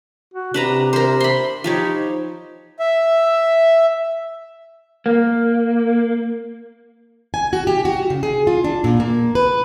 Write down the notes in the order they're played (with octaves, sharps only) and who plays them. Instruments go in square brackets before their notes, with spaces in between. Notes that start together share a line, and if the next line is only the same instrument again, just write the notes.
[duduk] F#4
[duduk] C3 [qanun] D4 B4 A#5
[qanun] A#4 C5
B5 C6
[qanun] F3 G4 C#5 [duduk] D#4
[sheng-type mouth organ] E5
[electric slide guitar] A#3
[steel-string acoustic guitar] G#5
F#4
G4
F#4
C#3
G#4
F4
D4
A#2
A#3
B4